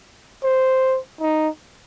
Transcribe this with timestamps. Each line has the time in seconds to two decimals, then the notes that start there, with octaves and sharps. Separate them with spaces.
0.44 C5
1.21 D#4